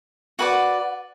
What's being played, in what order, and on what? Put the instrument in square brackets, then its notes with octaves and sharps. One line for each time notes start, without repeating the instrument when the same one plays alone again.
[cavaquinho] F#4 B4 D5 F#5